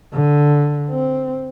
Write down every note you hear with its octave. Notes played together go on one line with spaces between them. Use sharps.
D3
C4